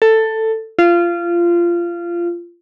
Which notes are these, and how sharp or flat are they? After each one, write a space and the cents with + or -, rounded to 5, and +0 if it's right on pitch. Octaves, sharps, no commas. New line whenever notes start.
A4 +10
F4 -20